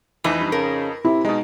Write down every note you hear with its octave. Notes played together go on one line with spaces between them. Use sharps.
F1 F2 E3 D#4 B4
G2
C#3 A#4
C3 E4
B2 G#3 D#4